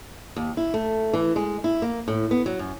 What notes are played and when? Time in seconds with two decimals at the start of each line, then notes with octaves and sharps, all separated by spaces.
0.36 D#2
0.57 E4
0.74 A3
1.13 E3
1.36 G#3
1.64 E4
1.82 A#3
2.08 A2
2.31 B3
2.46 F#3
2.59 F#2